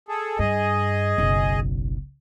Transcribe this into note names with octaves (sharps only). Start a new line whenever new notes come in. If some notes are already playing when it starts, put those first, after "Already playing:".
G#4 A4
G2 G#4 D#5
F#1 B1